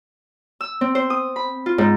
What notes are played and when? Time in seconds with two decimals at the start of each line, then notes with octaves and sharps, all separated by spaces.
0.61 E6
0.81 C4
0.95 C5
1.10 D#6
1.36 B5
1.66 F4
1.78 G#2